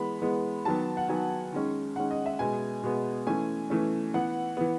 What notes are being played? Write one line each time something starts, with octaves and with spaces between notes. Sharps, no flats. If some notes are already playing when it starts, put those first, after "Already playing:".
Already playing: E3 G#3 B3 B5
E3 G#3 B3
D#3 F#3 B3 A5
F#5
D#3 F#3 B3 G#5
D#3 G#3 C#4
D#3 G#3 C#4 F#5
D#5
E5
B2 G#3 B3 G#5
B2 G#3 B3
E3 A3 C#4 G#5
E3 A3 C#4
E3 B3 F#5
E3 B3